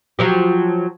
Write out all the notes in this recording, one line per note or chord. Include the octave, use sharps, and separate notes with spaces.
F3 F#3 G4